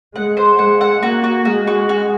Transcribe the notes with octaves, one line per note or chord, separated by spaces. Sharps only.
G#3 F#5
C5
G#3 F#5
F#5
A#3 F#4
F#4
G#3 F#4
F#4
F#4